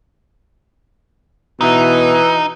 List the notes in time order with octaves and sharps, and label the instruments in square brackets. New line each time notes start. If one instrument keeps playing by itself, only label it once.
[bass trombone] B2 [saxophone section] E3 [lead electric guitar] D#4